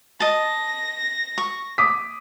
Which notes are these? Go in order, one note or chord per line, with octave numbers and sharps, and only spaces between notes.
D#5 A5 A#6
C#6
D6 D#6 B6